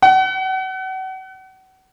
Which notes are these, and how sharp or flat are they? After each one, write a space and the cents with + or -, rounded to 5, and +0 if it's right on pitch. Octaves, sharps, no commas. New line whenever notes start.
F#5 +35